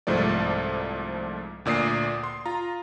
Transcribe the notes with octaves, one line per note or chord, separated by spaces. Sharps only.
C2 G#2 F3 A3 D5
D2 A#2 D5 D#6 C7
C6
F4 A#5